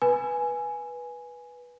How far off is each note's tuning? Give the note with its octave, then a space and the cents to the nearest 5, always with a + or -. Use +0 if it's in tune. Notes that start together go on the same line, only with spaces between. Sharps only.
B4 -15 G#5 +0 B5 +10